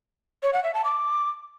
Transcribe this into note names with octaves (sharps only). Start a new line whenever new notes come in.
C#5
F#5
E5
A5
D6